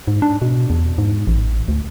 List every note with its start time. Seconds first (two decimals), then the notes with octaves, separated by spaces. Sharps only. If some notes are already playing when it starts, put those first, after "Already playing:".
0.08 G#2
0.22 D4
0.42 B2
0.70 E2
0.98 G#2
1.27 A1
1.68 D2